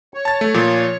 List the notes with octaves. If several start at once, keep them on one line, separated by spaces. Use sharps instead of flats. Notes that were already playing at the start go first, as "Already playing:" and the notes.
C#5
A5 A6
A3
A#2 F3